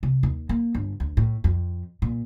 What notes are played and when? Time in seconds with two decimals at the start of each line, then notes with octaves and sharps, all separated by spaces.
0.03 C3
0.23 D#2
0.49 A#3
0.75 G1
1.00 D2
1.17 A2
1.44 F2
2.02 A#2